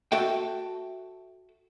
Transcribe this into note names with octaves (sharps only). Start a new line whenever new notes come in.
F#4 A4 E5 G5